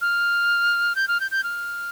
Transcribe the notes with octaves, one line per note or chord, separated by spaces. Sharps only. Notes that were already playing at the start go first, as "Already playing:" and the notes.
F6
G6
F6
G6
G6
F6